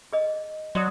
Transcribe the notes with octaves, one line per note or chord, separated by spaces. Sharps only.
G#4 D#5
F#3 F#4 D5 D#6